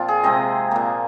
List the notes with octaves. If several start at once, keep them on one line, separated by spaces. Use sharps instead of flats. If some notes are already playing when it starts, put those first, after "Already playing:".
Already playing: A#2 F3 A#3 C4 F4 A#4
G#4
C3 G#3 C4 D#5
A#2 A#3